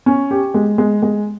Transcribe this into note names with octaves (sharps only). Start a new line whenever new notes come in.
C#4
G4
G#3
G#3
G#3